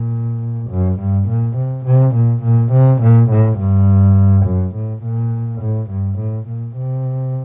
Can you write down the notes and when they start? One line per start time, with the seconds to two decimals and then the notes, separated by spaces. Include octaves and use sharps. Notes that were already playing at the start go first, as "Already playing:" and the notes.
Already playing: A#2
0.70 F#2
0.99 G2
1.28 A#2
1.56 C3
1.85 C3
2.15 A#2
2.43 A#2
2.72 C3
3.01 A#2
3.30 A2
3.59 G2
4.45 F#2
4.75 A2
5.03 A#2
5.61 A2
5.90 G2
6.18 A2
6.47 A#2
6.77 C3